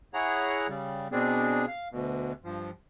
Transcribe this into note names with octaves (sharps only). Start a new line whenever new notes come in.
E4 G#4 C#5 F#5 A#5
C#3 G3
B2 B3 C4 D4 G#4
F5
D2 B2
G2 F3